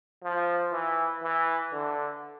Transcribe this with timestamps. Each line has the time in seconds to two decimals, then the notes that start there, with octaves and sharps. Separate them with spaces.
0.23 F3
0.72 E3
1.23 E3
1.73 D3